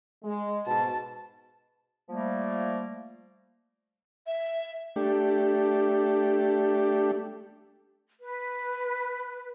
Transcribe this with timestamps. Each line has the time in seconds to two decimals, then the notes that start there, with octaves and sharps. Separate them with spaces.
0.24 G#3
0.67 G#2 B2 A5
2.09 F3 G3 A3 A#3
4.27 E5
4.96 A3 D4 G4
8.21 B4